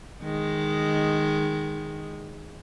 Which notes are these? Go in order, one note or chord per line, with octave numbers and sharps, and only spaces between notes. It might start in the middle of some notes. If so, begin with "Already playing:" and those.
D#3 G#3